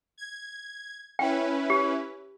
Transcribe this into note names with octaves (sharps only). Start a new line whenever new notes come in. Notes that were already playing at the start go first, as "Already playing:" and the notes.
G#6
C#4 E4 B4 G5
G4